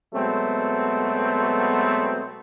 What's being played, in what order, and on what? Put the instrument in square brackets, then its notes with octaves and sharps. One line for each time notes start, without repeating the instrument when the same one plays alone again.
[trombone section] B2 F#3 G#3 A3 B3 C4